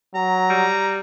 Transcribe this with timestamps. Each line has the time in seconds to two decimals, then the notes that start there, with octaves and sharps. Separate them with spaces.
0.15 F#3 A#5
0.50 G3